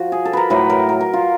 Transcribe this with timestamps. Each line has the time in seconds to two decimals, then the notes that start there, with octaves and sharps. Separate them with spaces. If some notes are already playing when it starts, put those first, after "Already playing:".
Already playing: F3 F#4
0.12 G#4
0.25 A4
0.33 A#4 B4
0.50 A2 F#3 A3 B4
0.70 A#4
0.89 A#4
1.01 A#4
1.13 F4